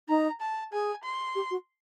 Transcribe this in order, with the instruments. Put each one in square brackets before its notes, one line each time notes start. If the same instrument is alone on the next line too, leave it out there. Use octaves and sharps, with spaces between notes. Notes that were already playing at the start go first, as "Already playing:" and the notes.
[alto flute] D#4 [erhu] A#5
[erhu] A5
[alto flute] G#4 [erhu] G#5
[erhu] C6
[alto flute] G4
F#4